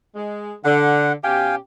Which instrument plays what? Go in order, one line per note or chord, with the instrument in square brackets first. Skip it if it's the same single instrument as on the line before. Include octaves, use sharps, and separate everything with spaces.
[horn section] G#3
[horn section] D3 [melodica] F#5
[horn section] B2 C#4 G4 [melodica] F5 G5 G#5